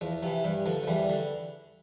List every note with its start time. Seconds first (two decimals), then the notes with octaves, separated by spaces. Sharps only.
0.01 E2 F3
0.22 C3 E3 F3
0.44 G2 E3
0.66 D3 F3
0.83 F3
0.87 E2 E3 G3
1.10 D3